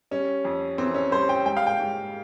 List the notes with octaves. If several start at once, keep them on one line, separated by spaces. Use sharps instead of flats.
G3 C#4
F2
E3 C4
C#4
G3 C5
G5
G#2 G5
F5
G5
G#2